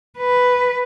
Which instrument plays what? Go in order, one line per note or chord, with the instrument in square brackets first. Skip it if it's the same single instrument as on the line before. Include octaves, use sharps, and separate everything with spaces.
[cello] B4